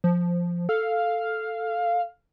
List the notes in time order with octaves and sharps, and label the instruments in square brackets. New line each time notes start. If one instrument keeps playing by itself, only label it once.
[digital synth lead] F3
[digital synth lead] A4 [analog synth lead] F5